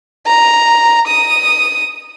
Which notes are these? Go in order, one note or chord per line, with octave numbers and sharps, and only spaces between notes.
A#5
D#6